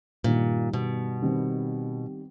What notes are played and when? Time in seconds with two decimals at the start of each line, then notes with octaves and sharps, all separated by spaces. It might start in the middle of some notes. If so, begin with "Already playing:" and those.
0.24 G2 A#2 D#3 G3
0.74 B2
1.22 D#3 G3 C4